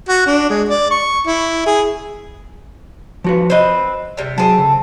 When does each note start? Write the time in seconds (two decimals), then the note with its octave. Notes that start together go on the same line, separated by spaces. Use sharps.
0.09 F#4
0.27 D4
0.50 G#3
0.69 D5
0.91 C#6
1.27 E4
1.66 G#4
3.24 F3 F#4 B4
3.50 C4 B4 C5 D#5
4.17 C3 G3
4.38 F#3 C4 G#4 A4
4.58 C#3